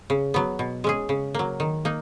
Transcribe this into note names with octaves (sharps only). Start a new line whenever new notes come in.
C#3
F#3 B3
B2
G#3 C#4 G#4
C#3
F#3 A#3
D#3
A#3 D#4